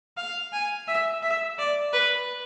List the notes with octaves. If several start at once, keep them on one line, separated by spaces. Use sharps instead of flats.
F5
G#5
E5
E5
D5
B4